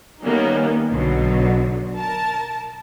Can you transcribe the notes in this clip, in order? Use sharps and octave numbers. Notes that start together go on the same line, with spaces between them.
D#3 G3 A#3 B3 C#4 D#4
B1 B2 D3 F#3
A#4 A5